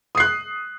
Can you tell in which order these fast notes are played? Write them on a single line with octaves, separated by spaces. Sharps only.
D#6 C7 F#6